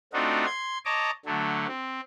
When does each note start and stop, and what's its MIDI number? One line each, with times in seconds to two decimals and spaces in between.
0.13 0.45 57
0.13 0.45 60
0.13 0.45 62
0.13 0.45 63
0.13 0.45 65
0.13 0.45 66
0.46 0.78 84
0.46 0.78 92
0.85 1.11 73
0.85 1.11 75
0.85 1.11 81
0.85 1.11 82
0.85 1.11 86
1.25 1.67 50
1.25 1.67 54
1.25 1.67 57
1.67 2.00 60